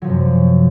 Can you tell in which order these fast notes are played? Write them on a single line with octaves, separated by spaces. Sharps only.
F#3 F3 C3 F#2